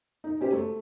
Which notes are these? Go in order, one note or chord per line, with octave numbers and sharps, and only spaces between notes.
D#4
C#4 G4 C5
A3